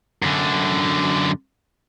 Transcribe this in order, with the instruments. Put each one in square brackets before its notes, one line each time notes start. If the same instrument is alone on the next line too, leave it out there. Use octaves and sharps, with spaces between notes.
[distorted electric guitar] F#2 D3